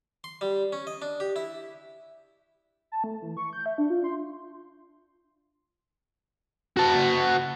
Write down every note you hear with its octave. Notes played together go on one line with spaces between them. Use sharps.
C6
G3
C#4
D#5
D4
G4
E4
A5
A3
E3
C#6
G6
E5
D4
F4
C6
F#4 A5